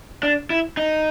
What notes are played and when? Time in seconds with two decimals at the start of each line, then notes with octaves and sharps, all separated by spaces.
0.23 D4
0.50 E4
0.77 D#4